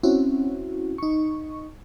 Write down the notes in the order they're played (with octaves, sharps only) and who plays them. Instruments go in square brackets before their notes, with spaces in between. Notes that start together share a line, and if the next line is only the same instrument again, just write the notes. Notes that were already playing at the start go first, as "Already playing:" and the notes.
[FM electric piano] C4 C#4 E4 F#4
D#4 C#6